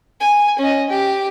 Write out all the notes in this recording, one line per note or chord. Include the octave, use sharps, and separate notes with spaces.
G#5
C#4 D#5
G4